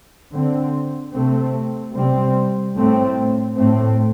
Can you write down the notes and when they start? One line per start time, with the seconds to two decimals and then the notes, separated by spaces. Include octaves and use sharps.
0.33 D3 C4
1.14 C3 A3 C4
1.93 C3 G3 C4
2.75 A2 A3 C4
3.55 A2 A3 C4